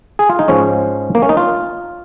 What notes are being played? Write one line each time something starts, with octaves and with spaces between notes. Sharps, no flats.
G#4
F4
D#4
G#2 F3 G#3 C#4
A#3
C#4
D#4
F4